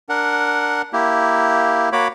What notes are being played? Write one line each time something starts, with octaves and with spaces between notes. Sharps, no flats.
D4 A#4 F#5
A#3 E4 G4
A#3 F#4 C#5 B5 D6